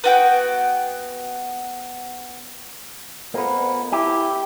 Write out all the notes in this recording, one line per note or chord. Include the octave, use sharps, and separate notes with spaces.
B3 F#4 G5
F2 A#3 B3
E4 G4